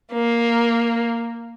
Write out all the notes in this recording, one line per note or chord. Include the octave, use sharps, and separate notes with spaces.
A#3